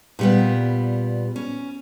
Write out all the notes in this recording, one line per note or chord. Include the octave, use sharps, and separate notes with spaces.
A#2 G3 B3
C#4